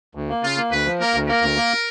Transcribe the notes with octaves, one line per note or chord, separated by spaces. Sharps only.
D2
A#3
C#3 F4
A#3
D2 B4
F3
A#3 A#4
D2
A#3 A#4
D2
A#3